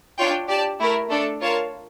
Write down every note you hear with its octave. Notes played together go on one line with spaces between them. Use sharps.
D4 F4 C#5 G5
G4 D5 A5
A3 E4 A#4
A3 D4 A4 D5
F4 A#4 C#5 F5 A5